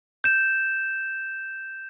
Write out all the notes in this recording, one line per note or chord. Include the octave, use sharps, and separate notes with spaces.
G6 E7